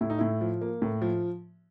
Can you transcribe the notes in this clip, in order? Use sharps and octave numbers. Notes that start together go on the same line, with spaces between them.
A2 E4
D#4
A2 E4
F3
A#3
A2
F3